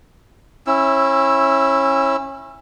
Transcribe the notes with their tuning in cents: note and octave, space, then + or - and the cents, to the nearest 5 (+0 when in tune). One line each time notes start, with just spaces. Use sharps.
C#4 -30 E4 +0 E6 +10